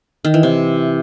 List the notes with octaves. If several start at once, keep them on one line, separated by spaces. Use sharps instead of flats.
D#3
E3
C3